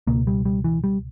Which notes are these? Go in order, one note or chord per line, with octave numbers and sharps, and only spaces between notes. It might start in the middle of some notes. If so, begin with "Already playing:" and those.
C#2 B2 A#3
G3
G3
E3
G3